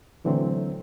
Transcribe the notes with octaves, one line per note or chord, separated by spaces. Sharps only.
A#2 D3 E3 F#3 A3 C4